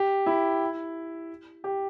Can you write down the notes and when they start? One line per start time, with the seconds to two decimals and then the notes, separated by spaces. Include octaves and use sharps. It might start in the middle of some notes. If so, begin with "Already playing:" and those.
Already playing: G4
0.26 E4
1.64 G4